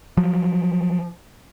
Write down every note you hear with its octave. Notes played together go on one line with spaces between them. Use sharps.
F3 F#3